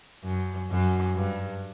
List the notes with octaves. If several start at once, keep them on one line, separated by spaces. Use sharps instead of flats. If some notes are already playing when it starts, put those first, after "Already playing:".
F#2
F#2
G2